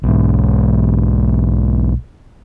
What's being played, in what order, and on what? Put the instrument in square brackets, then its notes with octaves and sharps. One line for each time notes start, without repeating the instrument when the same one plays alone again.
[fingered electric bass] B1 G#2